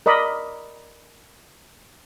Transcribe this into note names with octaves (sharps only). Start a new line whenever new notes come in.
A#4 D5 D#5 B5